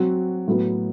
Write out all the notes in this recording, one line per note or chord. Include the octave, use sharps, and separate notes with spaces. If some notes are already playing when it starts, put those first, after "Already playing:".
Already playing: F#3 C4 F#4
A2 F#3 B3